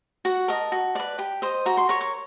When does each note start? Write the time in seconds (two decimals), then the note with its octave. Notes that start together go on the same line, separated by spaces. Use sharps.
0.25 F#4 F#5
0.48 A#4 D#5 A5
0.72 F#4
0.95 B4 D5
1.19 G4
1.42 C5 D#5
1.66 F#4 A#5
1.77 C6
1.89 A#4 C#5 C#6
2.01 C#6